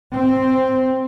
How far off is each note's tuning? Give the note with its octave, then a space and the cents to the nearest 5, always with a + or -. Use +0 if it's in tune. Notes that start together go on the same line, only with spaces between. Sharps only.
C4 +0